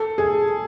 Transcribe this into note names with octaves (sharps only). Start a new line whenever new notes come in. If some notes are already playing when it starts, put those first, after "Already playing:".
Already playing: A4
G#4